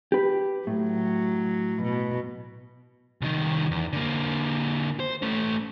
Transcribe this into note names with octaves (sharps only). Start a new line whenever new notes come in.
G4 B4
A2 F#3
B2
C2 D#3
E2
D3 A#3
C5
A3 C#4